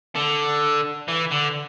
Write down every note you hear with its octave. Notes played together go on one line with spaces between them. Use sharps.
D3
E3
D3